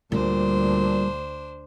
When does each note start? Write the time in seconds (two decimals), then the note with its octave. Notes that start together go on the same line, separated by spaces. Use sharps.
0.12 D2 A#2 G3 D4 C5